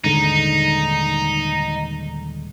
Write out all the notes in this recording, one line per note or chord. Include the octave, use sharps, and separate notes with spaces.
D#1 G#2 D3 D#4